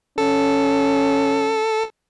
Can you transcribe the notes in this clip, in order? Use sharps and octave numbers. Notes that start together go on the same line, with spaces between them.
C#4 A4